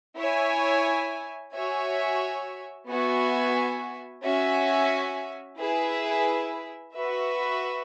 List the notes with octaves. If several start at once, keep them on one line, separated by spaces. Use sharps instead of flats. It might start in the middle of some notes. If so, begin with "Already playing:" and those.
E4 C#5 E5 G#5
F#4 C#5 E5 G#5
B3 F#4 E5 G#5
C#4 F#4 E5 G#5
E4 G#4 B4 E5
F#4 B4 E5